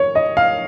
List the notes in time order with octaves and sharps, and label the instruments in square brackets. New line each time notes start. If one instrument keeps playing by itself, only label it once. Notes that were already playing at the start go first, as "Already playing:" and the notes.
Already playing: [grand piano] C#5
D#5
F5